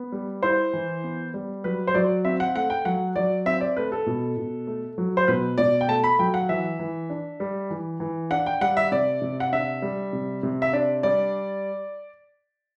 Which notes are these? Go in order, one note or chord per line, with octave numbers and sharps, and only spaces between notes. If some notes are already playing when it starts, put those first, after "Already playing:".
Already playing: B3
G3
E4 C5
E3
B3
G3
F#3 B4
C5
F#3 D5
C4 E5
F#5
A3 F#5
G5
F#3 F#5
F#3 D5
C4 E5
D5
A3 B4
A4
B2
B2
A3
F#3
C5
B2 B4
B2 D5
G5
A3 A5
B5
F#3 G5
F#5
E3 E5
E3
D4
G3
E3
E3
D4 F#5
G5
G3 F#5
E5
C3 D5
C3
F#5
D4 E5
G3
C3
C3
E5
D4 D5
G3 D5